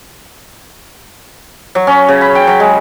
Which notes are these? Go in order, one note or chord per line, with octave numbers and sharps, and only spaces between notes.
F#3
C#4
C#3
B5
G5
F#3
G#3